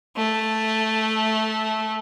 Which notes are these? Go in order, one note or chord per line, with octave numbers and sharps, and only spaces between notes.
A3